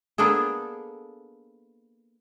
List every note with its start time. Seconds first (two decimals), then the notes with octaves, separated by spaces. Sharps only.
0.18 A#3 B3 D4 G#4 A4